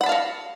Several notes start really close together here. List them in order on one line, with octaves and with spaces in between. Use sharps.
F#5 B5 A5 F5 F#4